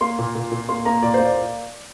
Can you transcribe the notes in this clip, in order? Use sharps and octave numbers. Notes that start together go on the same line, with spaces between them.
A#3 C6
A#2
A#2
A#2
A#3 C6
A#3 A#5
A#2 D5
C5
A#3
D5